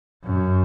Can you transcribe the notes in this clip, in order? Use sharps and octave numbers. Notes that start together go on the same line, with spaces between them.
F#2